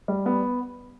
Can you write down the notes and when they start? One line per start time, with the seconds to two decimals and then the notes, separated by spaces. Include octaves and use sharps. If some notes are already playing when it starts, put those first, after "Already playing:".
0.08 G3
0.26 B3